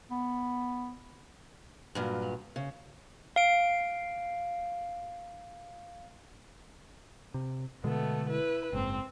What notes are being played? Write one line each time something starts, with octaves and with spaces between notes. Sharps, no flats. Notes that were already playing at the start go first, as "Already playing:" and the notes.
B3
G2 A#2 F#3
C#3
F5 D7
C3
B2 D3 G#3 A3 B3
E4 B4
F#1 G#2 C4